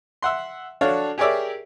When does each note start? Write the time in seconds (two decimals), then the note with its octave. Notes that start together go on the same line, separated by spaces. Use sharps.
0.22 E5 F#5 C6
0.81 D4 F#4 A4 C#5 F5
1.18 G4 G#4 A#4 C#5 D5 E5